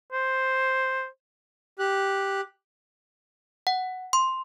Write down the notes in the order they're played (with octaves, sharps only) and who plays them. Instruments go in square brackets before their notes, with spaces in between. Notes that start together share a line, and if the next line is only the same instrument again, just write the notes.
[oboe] C5
[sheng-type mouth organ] G4 F#6
[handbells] F#5
C6